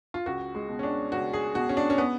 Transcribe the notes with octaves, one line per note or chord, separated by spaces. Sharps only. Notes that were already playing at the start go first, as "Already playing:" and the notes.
F4
C#2 F#4
G#3
B2
C#4
D4
C#2 F#4
G#4
B2 F#4
C#4
D4
C#4
B3